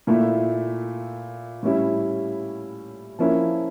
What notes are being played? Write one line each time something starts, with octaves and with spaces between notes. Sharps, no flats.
A#2 A3 E4
A2 G3 C#4 E4
F3 A#3 C#4 E4